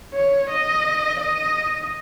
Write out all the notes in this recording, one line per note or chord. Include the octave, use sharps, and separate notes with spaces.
C#5
D#5
D#5